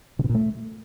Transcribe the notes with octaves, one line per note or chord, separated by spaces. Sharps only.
C#3
B2
A#2
A3